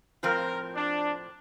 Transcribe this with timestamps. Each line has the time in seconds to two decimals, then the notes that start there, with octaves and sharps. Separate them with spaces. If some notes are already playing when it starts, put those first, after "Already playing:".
0.23 A2 F3 C4 F4 A#4 C5
0.76 D4